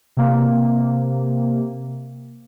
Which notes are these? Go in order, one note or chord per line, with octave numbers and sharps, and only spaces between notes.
C3 A#3